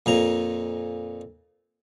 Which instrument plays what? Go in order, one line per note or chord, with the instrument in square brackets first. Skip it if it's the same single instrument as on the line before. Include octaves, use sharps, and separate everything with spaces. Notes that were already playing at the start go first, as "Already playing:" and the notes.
[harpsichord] F2 A#2 A#5